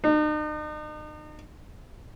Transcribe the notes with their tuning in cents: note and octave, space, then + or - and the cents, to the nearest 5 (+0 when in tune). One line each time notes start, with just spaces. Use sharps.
D#4 -40